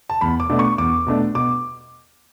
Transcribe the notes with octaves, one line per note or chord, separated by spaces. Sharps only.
A5
E2 B5
D6
B2 A3 D4
C#6
E2 D6
B2 A3 D4
B2 D6